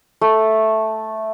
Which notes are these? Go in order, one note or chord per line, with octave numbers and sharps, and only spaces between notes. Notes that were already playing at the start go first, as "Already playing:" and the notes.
A3